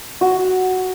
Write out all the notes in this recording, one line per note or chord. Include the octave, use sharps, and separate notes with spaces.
F#4